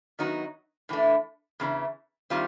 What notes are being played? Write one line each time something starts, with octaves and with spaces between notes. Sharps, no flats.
D#3 F#3 B3 D#4 F#4
A2 E3 A3 D4
E2 C#3 E3
D#3 G3 C4 F4